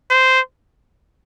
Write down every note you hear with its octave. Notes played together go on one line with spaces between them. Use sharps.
C5